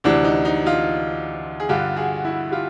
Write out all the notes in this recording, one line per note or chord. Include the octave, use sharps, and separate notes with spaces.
D2 C3 E3 D4
D#4
D#4
D#4 F4
G#4
G2 D3 F4 G4
F#4 G#4
E4 F#4
F4 G4